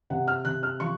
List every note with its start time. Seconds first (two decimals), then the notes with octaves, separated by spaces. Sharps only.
0.10 C3 F#5
0.28 F6
0.45 C3 F#6
0.63 F6
0.80 F3 C#6